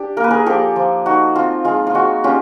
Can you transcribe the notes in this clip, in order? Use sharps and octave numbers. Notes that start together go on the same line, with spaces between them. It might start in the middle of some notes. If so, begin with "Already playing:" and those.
Already playing: D4 G4
A#3 A#4
B4
G#4 A#4
F3 G4 A4
F3
D#4 F#4
C4 F4
G#3 F4
F4
G#3 F#4
C#4 F4 G4